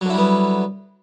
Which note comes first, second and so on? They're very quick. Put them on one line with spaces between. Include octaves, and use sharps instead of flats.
F#3 D3 E4 G3 B3